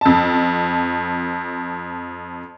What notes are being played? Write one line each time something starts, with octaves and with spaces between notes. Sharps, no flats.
F2 A5